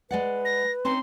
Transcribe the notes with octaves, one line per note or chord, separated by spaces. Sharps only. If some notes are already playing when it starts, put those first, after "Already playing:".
G#3 B4 D5 F#5
A#6
C4 C#4 D#4 C6